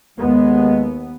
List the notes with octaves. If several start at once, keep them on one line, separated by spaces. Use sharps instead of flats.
D#2 G#3 B3